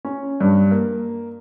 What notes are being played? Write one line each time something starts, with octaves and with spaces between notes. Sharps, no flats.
C#4
G2
A#3